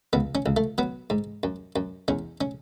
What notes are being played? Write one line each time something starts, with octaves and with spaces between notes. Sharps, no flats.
C#2 B3
C#4
C#2
A3
F#3 B3
G#2
F#2
F#2
E2 C#4
C#4